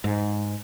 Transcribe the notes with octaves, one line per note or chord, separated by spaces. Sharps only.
G#2